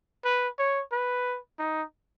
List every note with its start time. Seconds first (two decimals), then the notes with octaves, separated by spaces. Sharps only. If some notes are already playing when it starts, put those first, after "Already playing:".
0.24 B4
0.58 C#5
0.92 B4
1.59 D#4